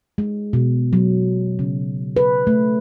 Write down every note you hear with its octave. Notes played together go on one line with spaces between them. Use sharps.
G#3
B2
F#3
C#3
B4
A3